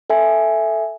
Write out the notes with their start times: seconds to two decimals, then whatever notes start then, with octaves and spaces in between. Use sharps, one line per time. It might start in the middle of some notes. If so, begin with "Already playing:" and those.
0.10 A4 E5 G#5